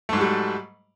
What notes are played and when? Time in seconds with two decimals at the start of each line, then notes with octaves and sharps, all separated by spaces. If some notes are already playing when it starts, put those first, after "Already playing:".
0.09 A3
0.13 G#2
0.17 F#3
0.21 G3